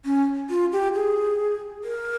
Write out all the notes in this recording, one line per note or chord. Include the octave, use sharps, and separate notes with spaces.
C#4
F4
G4
G#4
A#4